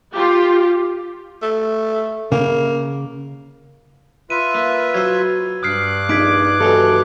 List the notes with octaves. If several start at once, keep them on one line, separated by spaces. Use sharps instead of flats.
F4 G4
A3
C#3 A#3
F4 B4 E5 D#7
A#3
F#3 C5 E6 G#6
G2 D6 D#6 F6 F#6 C7
A#1 D#4 G#6 B6 D7
D#2 E3 F#3 A4